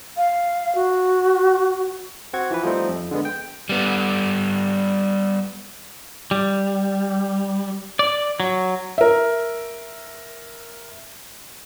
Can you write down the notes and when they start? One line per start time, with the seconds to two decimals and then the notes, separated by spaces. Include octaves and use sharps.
0.17 F5
0.75 F#4
2.33 C4 F#4 F#5 G#6
2.51 E3 F3 B4
2.63 F3 G3 A3 C4 D#4
2.89 F2
3.11 D3 G#3 B3
3.25 G5
3.69 G3 B3
6.31 G3
7.99 D5
8.40 F#3
8.98 A#4 E5